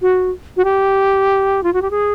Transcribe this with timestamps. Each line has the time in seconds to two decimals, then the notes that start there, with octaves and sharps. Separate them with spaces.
0.02 F#4
0.57 F#4
0.65 G4
1.64 F4
1.73 F#4
1.82 G4
1.91 G#4